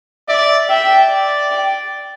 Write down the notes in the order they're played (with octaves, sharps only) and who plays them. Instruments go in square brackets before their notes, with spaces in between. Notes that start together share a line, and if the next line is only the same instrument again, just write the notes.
[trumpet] D5 [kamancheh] E5
[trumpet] E5 [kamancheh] G5
[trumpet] D5
[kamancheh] G5